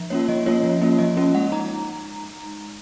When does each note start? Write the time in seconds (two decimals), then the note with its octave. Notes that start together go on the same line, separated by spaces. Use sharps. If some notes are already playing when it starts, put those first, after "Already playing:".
Already playing: F3
0.10 A#3 C#4 F4 C#5
0.28 F3 D#5
0.46 A#3 C#4 F4 C#5
0.63 F3
0.81 A#3 C#4 F4
0.99 F3 D#5
1.17 A#3 C#4 F4
1.34 G#3 F#5
1.52 D#4 A#5